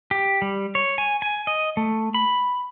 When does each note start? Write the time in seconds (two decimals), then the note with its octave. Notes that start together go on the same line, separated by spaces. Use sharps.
0.11 G4
0.42 G3
0.75 C#5
0.98 G#5
1.22 G#5
1.47 D#5
1.77 A3
2.14 B5